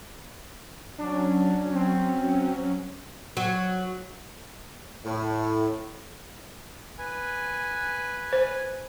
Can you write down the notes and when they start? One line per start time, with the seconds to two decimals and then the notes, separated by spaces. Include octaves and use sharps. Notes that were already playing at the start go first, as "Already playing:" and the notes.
0.98 F#3 C#4 D4
1.74 C4
3.37 F#3
5.04 A2
6.99 B4 G#5
8.33 C5